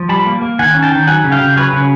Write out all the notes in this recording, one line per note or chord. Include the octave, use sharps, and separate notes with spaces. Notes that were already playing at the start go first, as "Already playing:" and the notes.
Already playing: F3
G3 A5 B5
A#3
A#3
D#3 F#5 G#5
C#4
G5 A5
D#3
F#3 F#5 G#5
C#3
F5 G5
C#3
F#3 B4 C#5
C#3